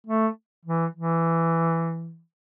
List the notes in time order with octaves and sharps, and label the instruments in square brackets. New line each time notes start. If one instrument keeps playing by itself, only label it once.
[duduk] A3
E3
E3